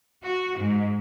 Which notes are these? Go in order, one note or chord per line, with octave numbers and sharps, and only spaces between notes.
F#4
G#2